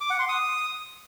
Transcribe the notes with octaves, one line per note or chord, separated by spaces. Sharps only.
D6
F#5
C6
D#6